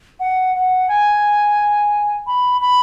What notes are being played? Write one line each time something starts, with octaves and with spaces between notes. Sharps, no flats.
F#5
F#5
G#5
B5
B5